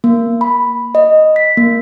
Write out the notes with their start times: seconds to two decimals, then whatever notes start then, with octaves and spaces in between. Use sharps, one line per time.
0.04 A#3
0.41 B5
0.95 D#5
1.36 B6
1.57 A#3